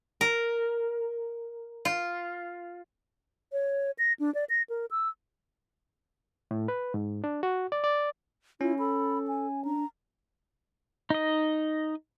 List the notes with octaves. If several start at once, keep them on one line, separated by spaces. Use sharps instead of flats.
A#4
F4
C#5
A#6
D4
D5
A#6
A#4
E6
A2
B4
G#2
D4
F#4
D5
D5
C#4 E4 F4
A4 B5
G#5
D4 A#5
D#4 D#5